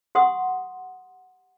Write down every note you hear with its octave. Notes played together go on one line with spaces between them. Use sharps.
G4 F#5 C6 D#6